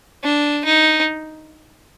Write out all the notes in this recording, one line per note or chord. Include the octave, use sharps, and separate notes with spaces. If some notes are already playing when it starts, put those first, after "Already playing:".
D4
D#4